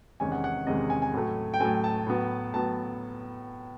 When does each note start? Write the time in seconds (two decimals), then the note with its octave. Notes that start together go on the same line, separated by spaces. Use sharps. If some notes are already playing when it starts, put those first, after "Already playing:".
0.20 E2 C3 D#3 G#3 C#4 G#5
0.32 F#5
0.44 F#5
0.67 E2 C3 D#3 G#3 C#4 D#5
0.90 G#5
1.02 G#5
1.13 A2 F#3 A3
1.54 G5
1.60 A2 F#3 A3 G#5
1.84 A5
2.07 A2 F#3 B3
2.54 A2 F#3 B3 A5